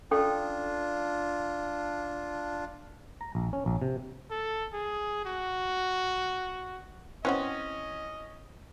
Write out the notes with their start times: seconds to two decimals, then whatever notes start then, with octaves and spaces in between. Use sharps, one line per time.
0.11 C#4 D4 F4 A4 G5
3.21 A#5
3.35 A#1
3.53 C#4
3.66 A#1
3.82 C3
4.31 A4
4.73 G#4
5.25 F#4
7.25 E3 C4 C#4 F#4 D#5